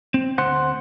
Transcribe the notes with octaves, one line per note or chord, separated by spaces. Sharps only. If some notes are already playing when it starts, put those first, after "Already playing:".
C4
D2 C5 F#5